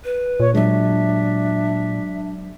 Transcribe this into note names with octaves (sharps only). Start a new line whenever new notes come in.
B4
A#2 C#5
F#3 G#3 D4 E5